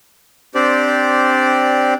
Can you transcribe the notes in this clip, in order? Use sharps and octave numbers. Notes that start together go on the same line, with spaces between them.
C4 D4 G4 C5 D5